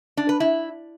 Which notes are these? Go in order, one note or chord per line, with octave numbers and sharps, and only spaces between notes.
D4
B4
E4